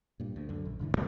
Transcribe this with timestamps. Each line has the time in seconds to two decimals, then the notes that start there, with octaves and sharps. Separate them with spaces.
0.20 G2 A#2
0.36 D2
0.49 F#2 D3
0.65 A#1
0.79 E1 G#2 D3 E3
0.94 F2 G#3 A3